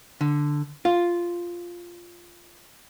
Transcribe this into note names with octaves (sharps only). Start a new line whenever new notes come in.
D3
F4